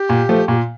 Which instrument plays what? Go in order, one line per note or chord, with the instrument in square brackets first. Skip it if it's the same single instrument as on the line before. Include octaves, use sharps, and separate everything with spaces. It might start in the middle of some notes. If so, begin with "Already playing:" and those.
Already playing: [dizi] G4
[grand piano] A#2
F3 A3
[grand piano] A#2 [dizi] G4
[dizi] F4